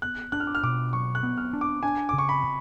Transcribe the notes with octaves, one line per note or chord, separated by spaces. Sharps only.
B3 F#6
D4 F#6
F6
D6
F6
B2 D6
F#3 C#6
F#6
B3
F6
D4
D6
D4 G#5
C#3 D6
C#6
B5
C#3